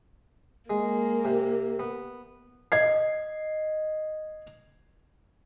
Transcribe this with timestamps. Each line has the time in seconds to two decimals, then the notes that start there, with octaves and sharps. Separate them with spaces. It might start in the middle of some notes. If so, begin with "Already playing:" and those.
0.70 G#3 A#3
1.25 C3
1.79 B3
2.72 D#5 G#6 C7